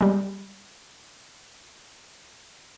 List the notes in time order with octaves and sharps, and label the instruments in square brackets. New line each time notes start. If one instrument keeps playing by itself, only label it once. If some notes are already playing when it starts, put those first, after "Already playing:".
[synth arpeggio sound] G3 G#3